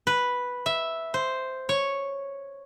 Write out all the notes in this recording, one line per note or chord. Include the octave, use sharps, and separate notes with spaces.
B4
E5
C5
C#5